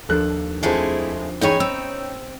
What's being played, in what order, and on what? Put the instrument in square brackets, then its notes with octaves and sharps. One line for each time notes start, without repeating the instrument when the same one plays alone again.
[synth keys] D#2 F3 D4 [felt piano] A4 F#6
[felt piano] F2 C5 [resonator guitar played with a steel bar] G#3 A3 [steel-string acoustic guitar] C4 E4 G#4
[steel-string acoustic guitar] E2 A2 G#4 [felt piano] C#4 G5 B5 [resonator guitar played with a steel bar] D#4 C#5
[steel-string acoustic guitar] C4 [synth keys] E6